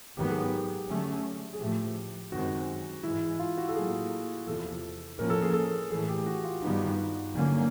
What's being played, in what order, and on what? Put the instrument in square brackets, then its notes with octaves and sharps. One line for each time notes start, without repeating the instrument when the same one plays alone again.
[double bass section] G#2 D#3 F#3 B3 [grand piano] G4
[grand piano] G#4
G4
[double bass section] D3 F#3 A3 C#4
[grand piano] G#4
[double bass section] A2 F3 A3 [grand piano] G4
[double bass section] F#2 D#3 G#3 C4 [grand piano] F#4
[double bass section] G#2 E3 G#3 [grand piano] E4
[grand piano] F4
F#4
A4
[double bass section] A2 F#3 A#3 [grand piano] G#4
[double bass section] E2 C3 F3 [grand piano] A4
[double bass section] A2 F3 A#3 C#4 [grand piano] A#4
[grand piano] A4
G#4
A4
[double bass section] A2 E3 A3 [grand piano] G#4
[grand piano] G4
F#4
F4
[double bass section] G2 D#3 G3 B3 [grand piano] D#4
[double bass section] D3 F#3 A#3 C#4